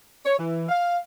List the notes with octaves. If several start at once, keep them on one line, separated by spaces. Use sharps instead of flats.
C#5
E3
F5